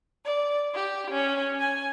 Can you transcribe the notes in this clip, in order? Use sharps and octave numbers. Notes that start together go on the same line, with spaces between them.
D5
G4
C#4
G#5